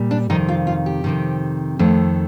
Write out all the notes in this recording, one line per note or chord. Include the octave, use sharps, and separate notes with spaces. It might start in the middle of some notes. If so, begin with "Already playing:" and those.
Already playing: A#2 G3
D4
F2 C3 D#3 D#4
F4
F4
G4
F2 C3 D#3
F2 D#3 A3